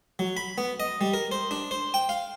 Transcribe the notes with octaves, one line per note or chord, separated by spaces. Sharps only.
F#3
B5
B3
D#5
G3
A#4
C5
D4
C5
G5
F5